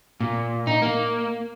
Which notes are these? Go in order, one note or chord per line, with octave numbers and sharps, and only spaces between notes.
A#2
D#4
A#3